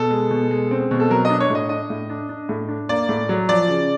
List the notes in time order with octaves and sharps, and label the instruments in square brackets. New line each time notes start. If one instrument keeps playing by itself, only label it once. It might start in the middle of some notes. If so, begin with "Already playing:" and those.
Already playing: [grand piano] B2 A4
G#3
B2
G#3
C4
B2
A4
F#3 A#4
D#5
D4
C#5
A2 D#5
D4 D#5
A2
D4
D4
A2
D4
A#3 D5
A2
F#3
F3 D5
C#3